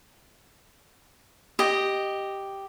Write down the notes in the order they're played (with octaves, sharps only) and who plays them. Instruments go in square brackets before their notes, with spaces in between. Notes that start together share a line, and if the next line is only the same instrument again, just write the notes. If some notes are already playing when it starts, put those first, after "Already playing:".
[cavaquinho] G4 D#5